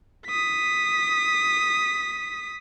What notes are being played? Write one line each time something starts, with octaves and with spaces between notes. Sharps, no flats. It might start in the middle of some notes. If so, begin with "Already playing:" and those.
D#6 B6